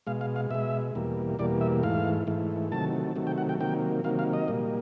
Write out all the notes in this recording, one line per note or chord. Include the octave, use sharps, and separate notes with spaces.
B2 G#3 F5
F5
F5
B2 G#3 E5
E2 B2 G3 A#3
E2 B2 G3 A#3 D5
E5
G#2 E3 A3 F5
G#2 E3 A3
C3 D#3 F#3 A3 A5
C3 D#3 F#3 A3
G5
F#5
G5
C3 D#3 F#3 A#3 G5
C3 D#3 F#3 A#3 F5
F5
D#5
A#2 G3 A#3